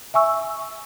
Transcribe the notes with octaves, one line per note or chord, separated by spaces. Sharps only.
E5 G#5 C#6 E6